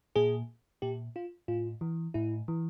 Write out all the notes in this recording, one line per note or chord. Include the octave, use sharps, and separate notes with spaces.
A#2 G#4
A#2 G4
F4
A2 F4
E3
A2 E4
E3